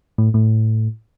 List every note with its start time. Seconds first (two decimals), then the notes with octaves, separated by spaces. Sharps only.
0.18 A2
0.34 A2